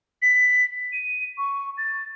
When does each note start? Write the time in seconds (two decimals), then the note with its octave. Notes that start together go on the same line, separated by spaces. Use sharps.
0.22 B6
0.93 D#7
1.38 C#6
1.78 A6